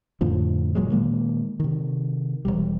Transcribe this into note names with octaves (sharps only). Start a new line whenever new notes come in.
F2 A2 D3 F3
F#1 A#2 F#3 G#3
A#2 D#3 G#3 A#3
C3 D#3
E1 D#2 G3